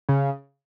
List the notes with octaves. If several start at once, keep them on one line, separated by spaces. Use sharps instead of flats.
C#3